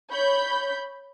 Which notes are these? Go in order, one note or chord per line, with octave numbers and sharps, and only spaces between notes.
C#5 B5 G6